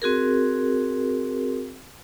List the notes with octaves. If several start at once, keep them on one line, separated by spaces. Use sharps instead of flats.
C4 F#4 G#4 A#4